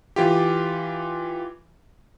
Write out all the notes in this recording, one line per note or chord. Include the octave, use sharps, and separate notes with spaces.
E3 F4 G4